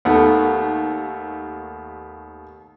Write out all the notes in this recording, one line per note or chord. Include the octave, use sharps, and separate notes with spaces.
D#2 A3 B3